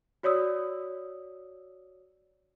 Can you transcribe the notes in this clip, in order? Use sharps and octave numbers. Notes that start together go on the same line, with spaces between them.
F#4 C#5 D5 D#6 E6